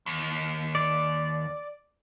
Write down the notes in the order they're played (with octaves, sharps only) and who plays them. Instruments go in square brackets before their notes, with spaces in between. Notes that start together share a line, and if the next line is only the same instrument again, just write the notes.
[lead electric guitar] D#2
[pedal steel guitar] D5